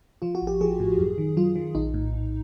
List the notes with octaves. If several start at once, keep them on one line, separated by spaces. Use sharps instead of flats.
F3 F4
F#4
A1
G4
F3 G#4
A2
F#2
D#3
F#3 F4
D#3
A#1 D#4
A2
A#1